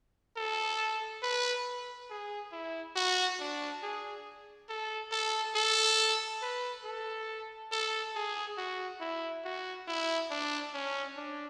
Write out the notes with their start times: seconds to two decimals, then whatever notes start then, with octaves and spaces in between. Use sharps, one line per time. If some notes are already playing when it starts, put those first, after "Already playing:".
0.37 A4
1.23 B4
2.10 G#4
2.52 E4
2.96 F#4
3.40 D4
3.83 G#4
4.69 A4
5.12 A4
5.55 A4
6.42 B4
6.85 A4
7.72 A4
8.15 G#4
8.58 F#4
9.01 E4
9.45 F#4
9.88 E4
10.31 D4
10.74 C#4
11.17 D4